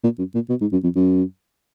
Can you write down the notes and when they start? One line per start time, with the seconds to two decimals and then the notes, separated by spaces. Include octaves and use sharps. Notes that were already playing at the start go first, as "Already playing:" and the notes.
0.04 A#2
0.18 F#2
0.35 A#2
0.49 B2
0.61 G#2
0.72 F#2
0.84 F2
0.96 F#2